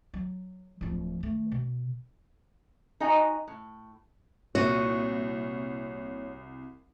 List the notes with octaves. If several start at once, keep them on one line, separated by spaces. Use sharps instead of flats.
F#3
D1 F3
D#3 A3
B2
D#4 F#4 D#5 G5 G#5 A#5
A2
C2 A#2 F#4 C#5 D#7